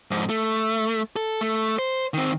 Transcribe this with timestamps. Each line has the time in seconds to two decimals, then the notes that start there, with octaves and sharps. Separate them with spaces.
0.11 F2 G#2
0.29 A3
1.16 A4
1.41 A3
1.79 C5
2.14 D#3 C4